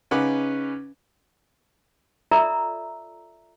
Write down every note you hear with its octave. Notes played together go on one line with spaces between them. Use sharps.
C#3 C#4 D#4 B4 F#5 D6
F4 A4 D5 E5 A#5 E6